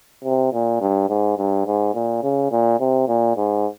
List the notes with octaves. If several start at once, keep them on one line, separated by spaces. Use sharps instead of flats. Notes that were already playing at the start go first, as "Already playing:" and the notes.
C3
A#2
G2
G#2
G2
G#2
A#2
C#3
A#2
C3
A#2
G#2